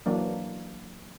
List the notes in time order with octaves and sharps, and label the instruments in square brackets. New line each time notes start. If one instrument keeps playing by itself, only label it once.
[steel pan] E3 F#3 A#3 D4